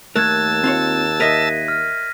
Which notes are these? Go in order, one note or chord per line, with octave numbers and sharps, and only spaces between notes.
D#2 A3 A#4 A5 E6 F#6 G#6
C4 F4 C#5
A#4 D#5 E5 A#6 B6 D#7
F6